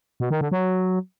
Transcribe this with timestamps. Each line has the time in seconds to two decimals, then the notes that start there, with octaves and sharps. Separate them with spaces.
0.20 B2
0.31 D#3
0.41 D3
0.52 F#3